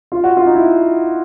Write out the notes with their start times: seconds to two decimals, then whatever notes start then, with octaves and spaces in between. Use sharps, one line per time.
0.12 F4
0.24 F#4
0.37 F4
0.47 D#4
0.55 E4